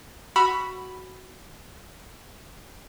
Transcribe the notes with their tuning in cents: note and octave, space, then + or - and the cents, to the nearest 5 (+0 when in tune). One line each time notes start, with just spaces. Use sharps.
F#4 +10 B5 +0 E6 +40